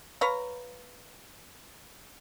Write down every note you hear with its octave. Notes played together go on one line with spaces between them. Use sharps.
B4 C#5 F5 A#5